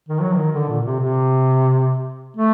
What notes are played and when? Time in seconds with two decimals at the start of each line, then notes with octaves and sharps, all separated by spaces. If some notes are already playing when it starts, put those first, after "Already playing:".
0.09 D#3
0.21 F#3
0.33 D#3
0.54 D3
0.69 A#2
0.85 C3
1.00 C3
2.37 A3